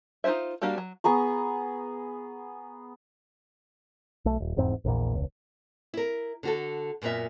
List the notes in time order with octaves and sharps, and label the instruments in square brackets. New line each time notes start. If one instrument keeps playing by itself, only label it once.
[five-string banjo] D#4 F4 F#4 C5 E5
G3 A#3 D4 F#4 G4
F#3
[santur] B3 G#4 A#5 C#6
[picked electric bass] B1 A3
D#1
F1 E2 G#2 C4
A#1 E2 A#2
E1 C#2
[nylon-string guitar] E4 A#4
D3 F#4 A4
F#2 A#2 B3 A#4 E5